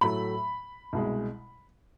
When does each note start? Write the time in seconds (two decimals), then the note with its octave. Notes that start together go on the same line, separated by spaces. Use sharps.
0.01 A2 F#3 A3 B5
0.93 C2 B2 G#3